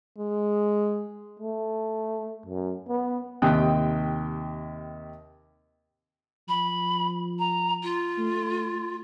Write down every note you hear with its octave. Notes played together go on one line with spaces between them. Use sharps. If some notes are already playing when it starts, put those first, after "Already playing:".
G#3
A3
F#2
B3
D#2 C3 G5 D#6 F#6
F3 B5
A#5
F4
A3